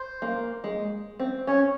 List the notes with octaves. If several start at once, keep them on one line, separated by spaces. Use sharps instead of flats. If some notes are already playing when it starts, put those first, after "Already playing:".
Already playing: C5
A#3
G#3
C4
C#4 C#5